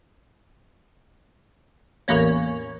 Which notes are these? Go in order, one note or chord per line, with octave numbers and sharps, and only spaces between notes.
A1 E2 A#3 C#4 C#5